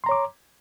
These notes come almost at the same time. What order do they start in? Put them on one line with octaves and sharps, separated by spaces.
C6 A#5 C#5 D6